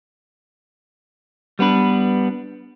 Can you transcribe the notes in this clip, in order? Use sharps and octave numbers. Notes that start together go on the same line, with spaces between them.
G3 B3 D4 B4